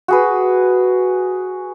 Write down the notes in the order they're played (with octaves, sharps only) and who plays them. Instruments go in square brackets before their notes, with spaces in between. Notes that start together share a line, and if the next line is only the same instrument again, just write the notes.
[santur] F#4 G#4 B4